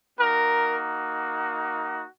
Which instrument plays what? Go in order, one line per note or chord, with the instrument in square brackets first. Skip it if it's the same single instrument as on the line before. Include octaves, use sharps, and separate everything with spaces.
[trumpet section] A#3 D#4 F#4 A#4